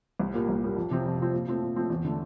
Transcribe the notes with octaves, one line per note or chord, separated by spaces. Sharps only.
C2
A#2 G3 A#3
C2
A#2 G3 A#3
F2
C3 F3 C4
F2
C3 F3 C4
A#2
F3 A3 C4
A#2
F3 A3 C4
E2
D3 A3